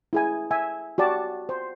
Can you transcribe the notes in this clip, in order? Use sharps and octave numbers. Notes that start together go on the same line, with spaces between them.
E4 G#4 G#5
E5 G#5
F#4 G4 D5 A5
C5